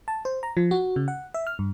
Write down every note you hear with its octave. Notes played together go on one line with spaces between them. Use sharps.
A5
C5
A#5
F3
F#4
C#3
F#5
E5
F6
G2